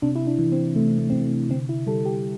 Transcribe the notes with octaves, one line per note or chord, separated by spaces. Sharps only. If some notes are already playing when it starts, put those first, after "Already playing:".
C3 D4
E4
D4
E3
C4
C3 A3
C4
A3
C3 C4
A3
D3 C4
E4
G3 A4
G4